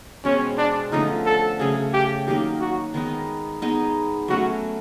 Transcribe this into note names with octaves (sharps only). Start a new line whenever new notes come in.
B2 G#3 C4 C#4
D4
D3 F3 A3 C#4 D#4
A4
C#3 F#3 A3 C#4 G#4
G4
D#3 F#3 A#3 D#4 G4
F#4
D#3 G#3 B3 D#4
G#3 B3 D#4 G#4
F#3 A3 C#4 F#4